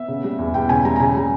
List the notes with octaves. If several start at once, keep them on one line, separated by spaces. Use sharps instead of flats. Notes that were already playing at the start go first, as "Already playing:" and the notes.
Already playing: B3 E5
C#3
G3
E2
E2 G5
C#3 G#5
G3 A#5
A#5
C#3 G#5
G3